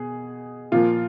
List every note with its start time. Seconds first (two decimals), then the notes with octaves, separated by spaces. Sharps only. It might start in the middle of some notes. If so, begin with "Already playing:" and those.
Already playing: B2 G#4
0.72 A#2 F3 F4